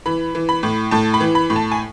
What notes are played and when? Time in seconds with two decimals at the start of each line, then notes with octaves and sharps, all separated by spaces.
0.06 E3 B5
0.35 E3
0.49 B5
0.63 A2
0.91 A2 A5
1.14 B5
1.21 E3
1.35 B5
1.50 A2
1.56 A5
1.72 G#5